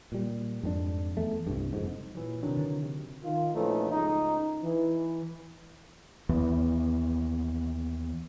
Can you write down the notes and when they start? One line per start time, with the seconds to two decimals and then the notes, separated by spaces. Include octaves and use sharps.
0.12 A#2 G3
0.63 F2 G#2 A3 D4
1.17 E2 A3
1.47 C2 G2
1.73 F#1 F2 G#2
2.15 A#2 E3 F#3
2.43 C3 D#3 E3 F#3 D4
2.57 D3
2.82 C3
3.23 D#3 F4
3.54 A#2 E3 F3 A3 C#4 D#4
3.91 C#2 D#4
4.62 E3
6.29 D#2 E3 B3